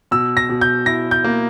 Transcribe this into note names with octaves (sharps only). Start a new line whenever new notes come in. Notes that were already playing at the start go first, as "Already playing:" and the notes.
B2 E6
A#6
B2
G6
E4 A#6
G6
A#3